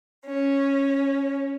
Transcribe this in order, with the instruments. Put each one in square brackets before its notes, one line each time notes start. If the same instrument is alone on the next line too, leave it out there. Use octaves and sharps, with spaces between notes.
[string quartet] C#4